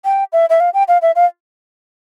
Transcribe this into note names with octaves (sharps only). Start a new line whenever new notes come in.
G5
E5
E5
F5
G5
F5
E5
F5